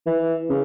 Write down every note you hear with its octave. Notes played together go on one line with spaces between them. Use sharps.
E3
C#3